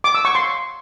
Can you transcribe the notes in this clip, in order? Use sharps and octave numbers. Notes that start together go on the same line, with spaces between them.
D6
E6
C#6
C6